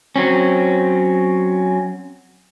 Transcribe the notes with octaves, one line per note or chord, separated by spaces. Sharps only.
F#3 C4 C#4